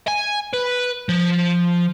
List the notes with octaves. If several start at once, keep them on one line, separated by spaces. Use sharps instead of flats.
G#5
B4
F3